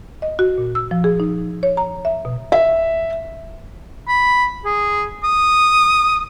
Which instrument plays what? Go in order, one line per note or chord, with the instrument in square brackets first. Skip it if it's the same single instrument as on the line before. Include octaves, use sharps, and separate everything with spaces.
[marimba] D#5
F#4
A#2
E6
F3
G#4
D#4
C#5
A#5
E5
B2
[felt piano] E5
[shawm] B5
G#4
D#6